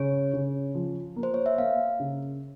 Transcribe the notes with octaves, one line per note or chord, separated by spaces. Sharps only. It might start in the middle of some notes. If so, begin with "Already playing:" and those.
Already playing: C#3 C#5
C#3
F3
A#3
C5
C#5
E5
A#3 F5
C#3